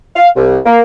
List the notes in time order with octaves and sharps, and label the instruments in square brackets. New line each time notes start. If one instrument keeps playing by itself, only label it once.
[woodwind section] F5
C2
A#3